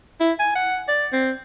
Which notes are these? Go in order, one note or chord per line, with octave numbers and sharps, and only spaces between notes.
E4
G#5
F#5
D5
C4